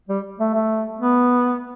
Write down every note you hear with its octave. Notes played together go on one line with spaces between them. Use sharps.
G3
A3
A3
B3